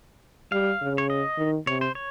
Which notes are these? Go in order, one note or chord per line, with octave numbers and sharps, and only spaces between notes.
G3 F5
C#3
C#5
D#5
D#3
C3 C#5
C5
C#5